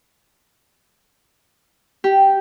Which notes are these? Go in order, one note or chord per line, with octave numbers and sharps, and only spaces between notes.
G4